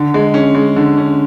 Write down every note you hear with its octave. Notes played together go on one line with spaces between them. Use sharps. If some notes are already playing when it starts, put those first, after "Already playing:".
Already playing: D3
G#3
C#4
G#3
D3
C#4